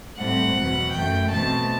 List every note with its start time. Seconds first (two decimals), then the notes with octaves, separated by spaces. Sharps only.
0.17 A2 G3 C4 F#5
0.55 E2 B2 F#3
0.93 F#2 E3 A3 G5
1.31 B2 A3 C4 A5